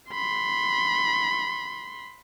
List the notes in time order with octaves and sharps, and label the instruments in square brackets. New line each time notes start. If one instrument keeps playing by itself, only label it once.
[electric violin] B5 C6